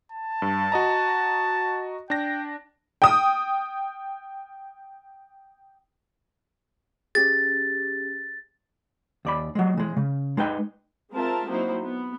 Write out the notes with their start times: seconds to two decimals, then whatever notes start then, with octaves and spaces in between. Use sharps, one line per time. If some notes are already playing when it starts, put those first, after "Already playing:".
0.12 A5
0.42 G2
0.72 F#4 D#5 A#5
2.10 D4 G5 A#6
3.02 G5 D#6
7.15 C#4 G4 G#4 A6
9.25 D#2 D5 B5
9.55 F#3 G#3
9.77 E3 G#3
9.97 C#3
10.37 G#3 D#4 B4 G5
11.11 G#3 C4 F4 A#4 E5 A5
11.46 F#3 A#3 C4 D#4 E4 C5
11.82 B3